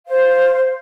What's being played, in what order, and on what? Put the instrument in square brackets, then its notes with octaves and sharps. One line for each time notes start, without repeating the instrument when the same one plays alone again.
[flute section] C5 F5